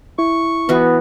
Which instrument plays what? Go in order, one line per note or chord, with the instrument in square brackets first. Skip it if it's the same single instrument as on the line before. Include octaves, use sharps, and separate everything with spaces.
[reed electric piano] E4 [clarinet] C#6
[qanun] E3 F#4 [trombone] B3